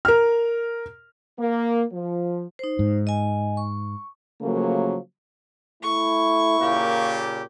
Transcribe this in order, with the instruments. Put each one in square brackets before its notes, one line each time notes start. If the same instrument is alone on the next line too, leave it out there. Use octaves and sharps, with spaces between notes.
[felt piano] A#4 F6
[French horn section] A#3
F3
[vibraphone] D#4 C5
[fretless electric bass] G#2
[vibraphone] D#5 G#5
C#6
[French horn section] C#3 F3 F#3 A3 A#3
[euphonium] A3 [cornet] E4 [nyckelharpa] C#6
[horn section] A#2 C#3 G4 [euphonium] A#3